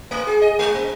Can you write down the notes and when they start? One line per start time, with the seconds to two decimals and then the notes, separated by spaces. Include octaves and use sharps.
0.11 A3
0.27 G#4
0.42 D#5
0.59 G#3
0.74 A#3